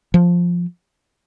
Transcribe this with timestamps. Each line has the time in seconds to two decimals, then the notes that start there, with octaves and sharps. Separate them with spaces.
0.14 F3